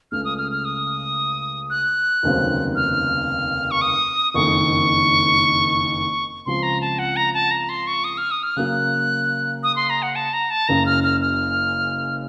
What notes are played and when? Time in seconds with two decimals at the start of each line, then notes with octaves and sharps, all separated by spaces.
0.12 C#2 C#3 A3 F6
0.25 D#6
0.38 F6
0.52 F6
0.65 D#6
1.70 F#6
2.23 F1 D#2 C#3 F#3 C4
2.76 F6
3.71 C#6
3.81 D#6
4.34 F#1 F2 D#3 C#6
6.46 C#2 C#3 F3 C4 F4 C6
6.63 A#5
6.81 A5
6.99 F#5
7.16 A#5
7.34 A5
7.51 A#5
7.69 C6
7.87 C#6
8.04 D#6
8.18 F6
8.31 D#6
8.43 F6
8.56 C#3 F#3 A#3 F#6
9.63 D#6
9.76 C6
9.90 A#5
10.02 F#5
10.16 A5
10.33 A#5
10.50 A5
10.68 F#1 F#2 C#3 A#5
10.86 F6
11.04 F6
11.21 F6